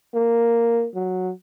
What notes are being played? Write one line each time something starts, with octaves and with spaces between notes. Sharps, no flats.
A#3
F#3